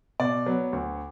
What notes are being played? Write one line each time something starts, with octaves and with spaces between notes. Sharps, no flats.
B2 D5 D6
F#3 B3
D2